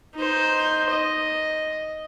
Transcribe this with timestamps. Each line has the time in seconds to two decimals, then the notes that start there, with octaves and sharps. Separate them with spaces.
0.15 D#4 C5
0.90 D#5